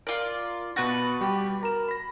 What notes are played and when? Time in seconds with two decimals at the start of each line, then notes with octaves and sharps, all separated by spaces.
0.07 F4 A#4 D5
0.76 B2 F#4 B4 A5 A6
1.21 G3 G4
1.63 A#4 A#5 E7
1.89 B5 A#6